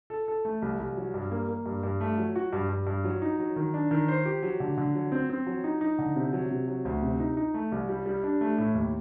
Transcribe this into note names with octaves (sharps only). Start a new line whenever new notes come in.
A4
A4
A3
C2
C2
F#3
G2
A#3
A#3
G2
G2
A3
F#3
F#4
G2
G2
G2
F#3
D#4
F#3
D#3
D4
D#3
C5
G4
F#3
D3
D3
F#3
C4
C4
F#3
D#4
D#4
D3
C3
F#3
C3
F#3
D2
C3
D#4
D#4
A3
C2
G3
G3
D4
A3
A2
D#2